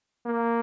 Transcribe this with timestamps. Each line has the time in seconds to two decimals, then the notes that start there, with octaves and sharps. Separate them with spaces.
0.26 A#3